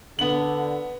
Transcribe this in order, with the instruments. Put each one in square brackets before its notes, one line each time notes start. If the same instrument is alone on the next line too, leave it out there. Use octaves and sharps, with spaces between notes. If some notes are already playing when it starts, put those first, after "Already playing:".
[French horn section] D3 [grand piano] B3 F#7